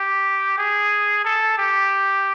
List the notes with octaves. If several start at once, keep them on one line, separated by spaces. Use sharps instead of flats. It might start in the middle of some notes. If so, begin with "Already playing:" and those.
Already playing: G4
G#4
A4
G4